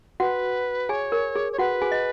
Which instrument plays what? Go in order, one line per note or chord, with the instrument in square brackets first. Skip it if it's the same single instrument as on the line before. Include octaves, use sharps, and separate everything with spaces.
[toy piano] F#4 F#5 [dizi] B4
[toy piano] G#4 G#5 [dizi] C#5
[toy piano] A#4
G#4
[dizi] C#5
[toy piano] F#4 F#5 [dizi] B4
[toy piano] G#4 G#5
D#5